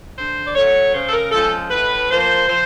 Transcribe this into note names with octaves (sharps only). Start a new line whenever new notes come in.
D3 C5
D5
F#3 A3 C#4 C#5
C#3 C5
A4
A#4
F3 G#3 C#4 A4
A2 B4
F3 A#3 C5
F3 C5